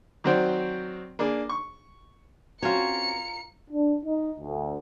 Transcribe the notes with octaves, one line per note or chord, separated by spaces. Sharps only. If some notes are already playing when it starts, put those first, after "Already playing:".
D#3 F#3 C4 F#4 C5 D5
A#3 D4 G#4
C#6
C4 C#4 F4 F#4 C#5 A#5 C#7
D4
D#4
D2